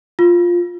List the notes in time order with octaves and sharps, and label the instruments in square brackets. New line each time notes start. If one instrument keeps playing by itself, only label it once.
[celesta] F4